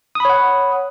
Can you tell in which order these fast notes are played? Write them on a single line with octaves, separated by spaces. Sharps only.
D#6 B5 C#5 F#5